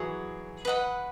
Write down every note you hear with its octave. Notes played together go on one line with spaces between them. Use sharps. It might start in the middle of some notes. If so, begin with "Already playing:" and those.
Already playing: E3 F#3 G#4 C#5 F#5
B4 D#5 F#5 B5